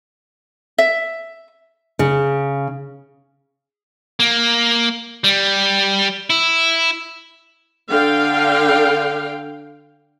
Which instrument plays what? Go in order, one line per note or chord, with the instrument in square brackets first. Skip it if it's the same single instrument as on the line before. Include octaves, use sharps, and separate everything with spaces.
[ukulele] E5
[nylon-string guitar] C#3
[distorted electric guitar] A#3
G3
E4
[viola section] D3 F5 G5